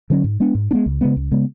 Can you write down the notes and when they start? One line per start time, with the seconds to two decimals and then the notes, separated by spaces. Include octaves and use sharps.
0.10 D3 F#3 C#4
0.24 G#2
0.40 G#3 B3 D4
0.55 G#2
0.71 G#3 B3 D4
0.86 C#2
1.01 C#3 G#3 B3
1.16 C#2
1.32 C#3 G#3 B3